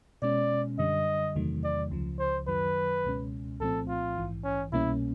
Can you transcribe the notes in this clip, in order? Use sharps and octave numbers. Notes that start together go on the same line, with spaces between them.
B2 G#3 C#4 D5
F#2 D3 G3 D#5
E2 C3 D#3 F#3 A3
D5
C#2 C#3 F3
C5
F#2 D#3 F#3 B4
C#2 B2 G#3 C#4
C2 A#2 F3 A3 C4 A4
F4
A#1 G#2 E3
C#4
C2 B2 G3 A#3 C#4 E4